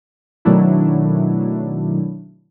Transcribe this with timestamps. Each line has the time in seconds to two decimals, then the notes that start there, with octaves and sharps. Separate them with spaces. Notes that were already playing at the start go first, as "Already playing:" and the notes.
0.45 B2 D#3 F#3 A3 D4 E4